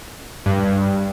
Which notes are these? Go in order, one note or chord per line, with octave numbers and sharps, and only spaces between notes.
G2